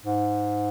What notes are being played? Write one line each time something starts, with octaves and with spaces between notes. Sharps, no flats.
G#2